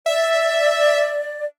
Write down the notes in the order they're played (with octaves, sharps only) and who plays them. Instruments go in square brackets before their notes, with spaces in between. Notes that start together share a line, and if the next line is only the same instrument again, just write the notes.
[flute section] D5 [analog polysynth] E5